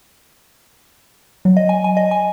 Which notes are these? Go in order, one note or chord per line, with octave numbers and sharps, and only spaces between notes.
F#3
D#5
G#5
G#5
D#5
G#5